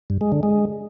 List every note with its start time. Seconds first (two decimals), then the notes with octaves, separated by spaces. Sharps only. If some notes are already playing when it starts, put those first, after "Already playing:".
0.10 G2
0.21 G#3
0.32 D3
0.43 G#3